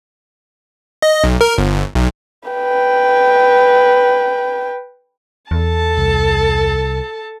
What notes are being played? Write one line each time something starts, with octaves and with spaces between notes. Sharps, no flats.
D#5
B1
A#4
G1
B1
B4 G5
E2 A4 A5
C2